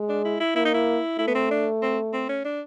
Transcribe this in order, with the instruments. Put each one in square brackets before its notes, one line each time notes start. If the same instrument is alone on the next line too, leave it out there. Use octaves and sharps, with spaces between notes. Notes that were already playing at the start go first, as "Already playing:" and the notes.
Already playing: [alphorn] G#3
[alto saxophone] D4
E4
E4
[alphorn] A#3 [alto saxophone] E4
[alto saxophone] D#4
E4
[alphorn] A3 [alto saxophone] E4
[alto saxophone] B3
C4
D4
C4
C4
C#4
D4